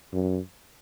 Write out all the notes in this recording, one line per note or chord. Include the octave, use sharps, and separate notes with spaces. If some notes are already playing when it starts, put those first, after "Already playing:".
F#2